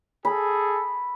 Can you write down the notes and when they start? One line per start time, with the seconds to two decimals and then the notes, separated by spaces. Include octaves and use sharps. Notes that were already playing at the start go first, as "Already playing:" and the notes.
0.25 G#4 A4 B5